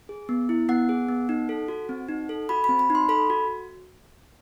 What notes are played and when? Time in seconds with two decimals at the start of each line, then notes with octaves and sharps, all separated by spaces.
0.09 G#4
0.29 B3
0.49 E4
0.69 B3 F#5
0.89 G#4
1.09 B3
1.29 D#4
1.49 A4
1.68 F#4
1.89 C4
2.09 D#4
2.29 A4
2.49 F#4 B5
2.64 C4 B5
2.79 B5
2.90 D#4
2.95 C6
3.09 A4 B5
3.30 F#4